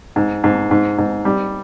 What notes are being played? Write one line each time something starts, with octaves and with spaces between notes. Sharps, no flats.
G#2
G#2
G#2
G#2
G3